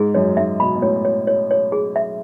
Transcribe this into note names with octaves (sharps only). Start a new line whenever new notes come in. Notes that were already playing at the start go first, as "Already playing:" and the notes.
Already playing: G#2 G#4
F#2 C#5
G#2 E5
B2 B5
B2
A2 C#5
C#5
C#5
C#5
G#4
E5